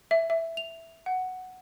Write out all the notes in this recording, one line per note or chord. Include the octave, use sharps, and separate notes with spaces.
E5
E5
F7
F#5